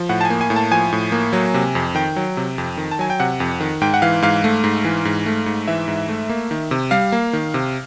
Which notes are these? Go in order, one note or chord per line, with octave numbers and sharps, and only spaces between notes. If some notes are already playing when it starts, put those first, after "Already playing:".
Already playing: F3
A2 F#5
A5
G#5
A#3
G#5
A2
A5
F3 G#5
A2
A#3
F#3
C3
F2
D#3 G5
F#3
C3
F2
D#3
A5
F#3 G#5
G5
C3 F#5
F2
D#3
G#2 G5
F#5
E3 F5
G#2 F5
A3
G#2
E3
G#2
A3
G#2
E3 E5
G#2
A3
A#3
D#3
C3
G3 F5
A#3
D#3
C3